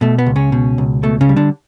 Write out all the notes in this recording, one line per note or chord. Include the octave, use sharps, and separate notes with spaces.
B2 A3
B3
C#2
C#3 C#4
B2
C#2
B2 A3
C#3 C#4
G3
D3 D4